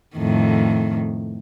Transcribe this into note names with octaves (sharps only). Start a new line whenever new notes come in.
F2 A2 D#3